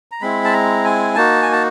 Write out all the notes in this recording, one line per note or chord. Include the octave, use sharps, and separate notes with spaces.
A#5
G#3 C4 E4 B5
A5
A#5
G#5
A#3 D#4 F#4 A5
G#5
A5